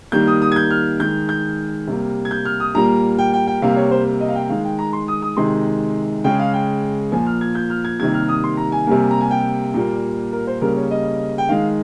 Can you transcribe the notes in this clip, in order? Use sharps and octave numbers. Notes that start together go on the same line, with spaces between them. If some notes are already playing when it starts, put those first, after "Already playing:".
D#3 G3 A#3 G6
D#6
D#6
G#6
G6
F6
D#3 G#3 G6
G6
C3 G3 A#3
G#6
G6
F6
D#6
A#2 G3 A#3 A#5
G5
G5
G5
C3 G3 A#3 F5
C#5
C5
D#5
F5
G5
D#3 G#3 F5
G5
A#5
C6
D#6
D#6
C3 D#3 G#3 C6
C#3 G#3 G5
F5
G5
A#2 F3 A#3 G#5
F6
G#6
G6
F6
G#6
C3 D#3 G3 A#3 G#6
F6
D#6
C6
A#5
G#5
C3 G3 A#3
A#5
G#5
G5
A#2 G3 A#3
A#4
C5
C#3 G3 A#3 A#4
C#5
D#5
G5
D#3 G#3 F5